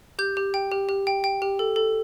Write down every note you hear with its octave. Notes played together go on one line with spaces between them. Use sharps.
G4 G6
G4
G5
G4
G4
G5
G5
G4
A4
A4